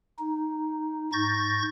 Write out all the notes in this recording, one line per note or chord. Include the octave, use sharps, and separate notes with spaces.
D#4
G#2 C#6 G6 A6 A#6